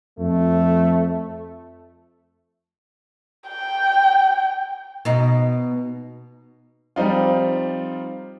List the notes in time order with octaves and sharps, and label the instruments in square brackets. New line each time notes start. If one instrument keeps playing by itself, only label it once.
[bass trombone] F2 [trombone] A3
[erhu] G5
[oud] B2 D#4
[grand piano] F3 G3 C4 D#4 F4